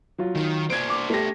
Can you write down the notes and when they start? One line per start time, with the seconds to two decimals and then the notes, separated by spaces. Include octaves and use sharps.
0.18 F#3 F4
0.35 D#3
0.70 D4 C5 G#6 D7
0.90 D6
1.10 A3 G4 A#6